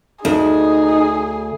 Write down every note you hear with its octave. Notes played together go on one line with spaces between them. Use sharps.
D2 D#4 G#4